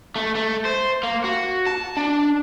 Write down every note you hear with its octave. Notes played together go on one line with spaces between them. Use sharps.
A3
A3
C5
A#3
F#4
A5
D4